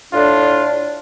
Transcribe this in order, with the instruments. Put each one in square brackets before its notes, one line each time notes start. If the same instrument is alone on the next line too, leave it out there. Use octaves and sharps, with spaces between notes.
[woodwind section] A2 D4 [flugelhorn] F4 [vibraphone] D5